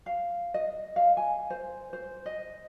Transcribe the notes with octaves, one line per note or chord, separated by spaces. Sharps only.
F5
D#5
F5
G#5
C5
C5
D#5